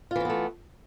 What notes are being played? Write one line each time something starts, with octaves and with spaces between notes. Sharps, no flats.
E3 A3 B3 C#4 F4